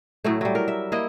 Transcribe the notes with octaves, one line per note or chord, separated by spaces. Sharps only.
A2 F#3 A3
F#3 G3
A#4
E5
A#3 E4 D#5